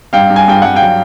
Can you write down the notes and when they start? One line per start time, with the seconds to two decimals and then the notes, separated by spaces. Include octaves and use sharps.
0.13 G2 F5 G5
0.30 G2
0.36 G#5
0.48 G2 G5
0.62 G2 F#5
0.75 F5 G5
0.82 F#3